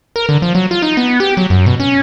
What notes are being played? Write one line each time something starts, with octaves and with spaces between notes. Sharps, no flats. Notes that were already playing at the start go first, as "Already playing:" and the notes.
A#4
D3
F3
F#3
F4
D#4
B3
G4
F#3
F#2
B2
C#4